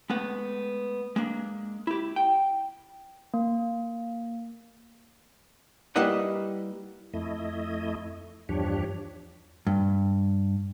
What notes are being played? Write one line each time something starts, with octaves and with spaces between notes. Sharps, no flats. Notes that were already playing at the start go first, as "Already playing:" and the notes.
G#3 A3 B3 F#5
G#3 A#3 D4
E4 G4
G5
A#3
G3 A#3 E4 B4 D#5 F#5
F2 A3 E4 D#5
E2 G2 F3 D4 G4 C#5
G2